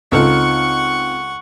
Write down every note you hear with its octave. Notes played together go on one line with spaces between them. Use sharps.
C#2 C4 D#4 F4 A4 F#5 C#6